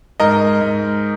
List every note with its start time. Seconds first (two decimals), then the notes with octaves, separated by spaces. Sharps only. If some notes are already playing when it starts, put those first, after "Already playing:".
0.20 G#2 A#4 D#5
0.61 G#2